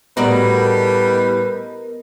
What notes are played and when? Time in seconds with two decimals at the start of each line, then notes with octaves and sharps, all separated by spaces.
0.17 A2 G3 B3 F#4 A#4 B4 D5 D#5